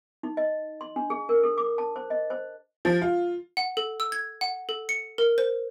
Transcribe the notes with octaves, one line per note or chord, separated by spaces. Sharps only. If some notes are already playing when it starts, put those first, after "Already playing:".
D#4
D#5
C6
D4
G#4
A#4
A4
D6
A5
C5
D#5
C5
F3
F4
F#5
A4
E6
G#6
F#5
A4
C#7
A#4
C5